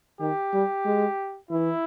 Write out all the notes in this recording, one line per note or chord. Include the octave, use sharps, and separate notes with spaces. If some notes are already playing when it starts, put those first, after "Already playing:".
D#3 G4
G3
G#3
E3 E4